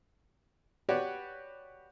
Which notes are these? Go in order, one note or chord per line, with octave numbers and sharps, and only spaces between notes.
F#4 G4 B4 C#5 D5